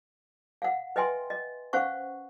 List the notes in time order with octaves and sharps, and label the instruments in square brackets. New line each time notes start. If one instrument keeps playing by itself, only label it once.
[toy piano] F5 F#5
B4 D#5 E5 G5 G#5 C6
D#5
C#4 C5 F5 F#5 C#6